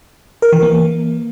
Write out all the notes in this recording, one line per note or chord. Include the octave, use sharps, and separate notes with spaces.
A#4
E3
A#3